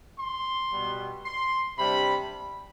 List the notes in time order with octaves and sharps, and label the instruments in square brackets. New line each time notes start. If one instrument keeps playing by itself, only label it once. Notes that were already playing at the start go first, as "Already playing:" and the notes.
[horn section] C6
B2 G3 B3
C6
C3 G3 D4 B5